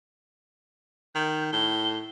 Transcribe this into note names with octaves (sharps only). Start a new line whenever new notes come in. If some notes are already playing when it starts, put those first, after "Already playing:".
D#3 G6
A2 G7